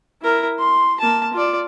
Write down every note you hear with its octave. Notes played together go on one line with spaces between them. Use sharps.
E4 A#4
C6
A#3 A5
F4 D5